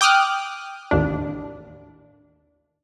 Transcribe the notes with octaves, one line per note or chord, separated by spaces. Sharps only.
G5 D6 D#6 F6 F#6
A1 D#2 D4